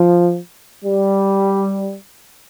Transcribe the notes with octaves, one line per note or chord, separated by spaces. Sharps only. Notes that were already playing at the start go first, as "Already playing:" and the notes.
Already playing: F3
G3